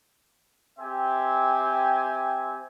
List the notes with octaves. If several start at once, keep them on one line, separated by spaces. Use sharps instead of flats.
C4 G4 E5 G#5